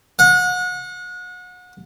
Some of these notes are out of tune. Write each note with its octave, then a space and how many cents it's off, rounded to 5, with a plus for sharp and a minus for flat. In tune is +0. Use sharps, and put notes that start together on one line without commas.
F#5 -35